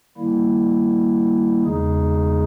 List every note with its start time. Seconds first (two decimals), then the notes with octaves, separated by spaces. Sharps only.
0.17 D#3 G3 A#3 E4
1.64 E2 C#3 G#3 D#4 G#4